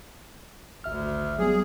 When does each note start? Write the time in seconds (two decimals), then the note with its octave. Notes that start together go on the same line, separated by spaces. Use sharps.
0.84 G#1 D2 E5 F6
1.39 F#3 G3 B3 G#4